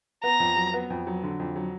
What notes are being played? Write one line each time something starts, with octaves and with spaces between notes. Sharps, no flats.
B3 A#5
F2
F#3
B3
F2
F#3
D3
F2
F#3